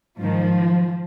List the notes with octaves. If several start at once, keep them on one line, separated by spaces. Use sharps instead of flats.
G#2 D#3 F3